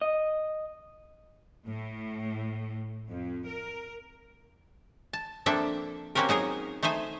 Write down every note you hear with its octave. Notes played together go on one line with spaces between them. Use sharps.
D#5
A2
F2
A#4
A5
F3 A#3 C4 D4 A4 E5
A#3 C4 C#4 F#4 G4 A#4
F#3 D#4 G#4 A#4
A3 D#4 C5 E5 G#5